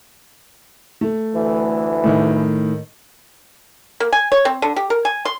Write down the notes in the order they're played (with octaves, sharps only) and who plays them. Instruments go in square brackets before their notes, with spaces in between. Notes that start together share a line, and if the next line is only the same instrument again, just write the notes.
[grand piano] A3
[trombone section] D2 E3
[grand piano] A2 D#3
[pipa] A#3
G#5
C#5
C4
D3
G4
A#4
G#5
C6